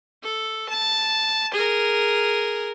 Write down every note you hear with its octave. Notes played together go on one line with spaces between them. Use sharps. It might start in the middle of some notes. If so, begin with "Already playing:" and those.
A4
A5
G#4 A#4